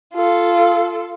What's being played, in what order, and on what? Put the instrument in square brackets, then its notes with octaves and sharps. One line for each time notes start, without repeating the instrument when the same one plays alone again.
[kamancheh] F4 A4